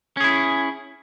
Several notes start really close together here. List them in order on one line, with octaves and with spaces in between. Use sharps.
C#4 G#4 E4